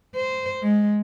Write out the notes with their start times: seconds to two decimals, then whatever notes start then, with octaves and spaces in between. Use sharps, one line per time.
0.16 C5
0.63 G#3